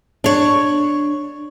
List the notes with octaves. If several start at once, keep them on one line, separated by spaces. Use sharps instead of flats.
D4 C#5